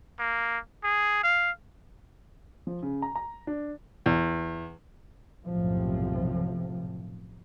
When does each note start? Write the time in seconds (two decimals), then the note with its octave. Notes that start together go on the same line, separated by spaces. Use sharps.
0.19 A#3
0.84 G#4
1.23 F5
2.67 F3
2.83 C#3
3.02 A#5
3.15 A#5
3.47 D4
4.06 E2
5.46 B1 F#2 A2 C3 F3